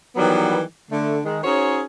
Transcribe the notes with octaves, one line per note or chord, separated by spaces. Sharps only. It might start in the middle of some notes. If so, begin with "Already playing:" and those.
D#3 E3 F#3 G3 B3
D3 A3
D#3 G#3
C#4 D#4 F#4 G#4 C5 C#5